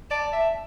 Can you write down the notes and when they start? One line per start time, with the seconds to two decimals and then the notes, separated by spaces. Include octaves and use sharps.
0.10 D5 A5
0.33 E5